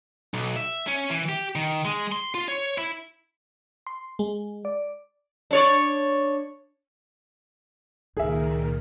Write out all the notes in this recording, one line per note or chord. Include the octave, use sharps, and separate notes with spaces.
B1
E5
C#4
E3
G4
D#3
G#3
C6
F4
C#5
E4
C6
G#3
D5
D4 C#5 D5
C#2 A#2 D#3 G#4 A#4 E5